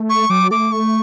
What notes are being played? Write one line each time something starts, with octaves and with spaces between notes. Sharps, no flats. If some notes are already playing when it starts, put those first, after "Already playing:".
Already playing: A3
C#6
F#3 D6
A3 D6
C#6